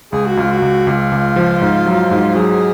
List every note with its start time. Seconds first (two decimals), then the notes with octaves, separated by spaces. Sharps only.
0.12 C#2 G#4
0.26 F#4
0.37 C#2 F4
0.51 F#4
0.62 C#2
0.87 C#2 F4
1.12 C#2
1.36 F3
1.61 G#2
1.86 F#3
2.11 G#2
2.35 F#3 G#4